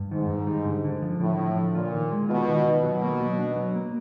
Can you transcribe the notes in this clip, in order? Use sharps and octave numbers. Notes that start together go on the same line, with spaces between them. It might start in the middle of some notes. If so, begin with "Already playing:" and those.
Already playing: G2
G#2 D#3
G2
G3
D3
D3
F3
A2 D3
F3
D3
A#2 F4
D#3
G#3
B2 F4
D#3
D#3
B2 F#3
A#3
F#3
D4
F#3
A#3